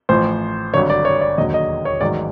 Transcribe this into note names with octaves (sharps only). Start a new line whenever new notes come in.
A1 A2 F3 C5
G#1 G2 D3 F#3 C#5
D5
C#5
D5
E1 D#2 D3 F#3 D#5
D#5
C#5
A1 G#2 D#3 F#3 D5